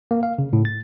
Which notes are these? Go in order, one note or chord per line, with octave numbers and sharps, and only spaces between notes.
A#3
F5
C#3
A2
A6